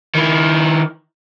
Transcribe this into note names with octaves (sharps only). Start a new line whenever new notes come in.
D#3 E4